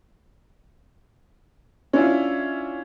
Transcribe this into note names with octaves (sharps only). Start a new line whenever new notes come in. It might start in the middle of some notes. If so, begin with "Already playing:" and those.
C#4 D4 E4 F4